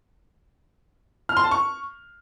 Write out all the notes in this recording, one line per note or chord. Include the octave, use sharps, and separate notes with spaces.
F6
C6
A5
C#6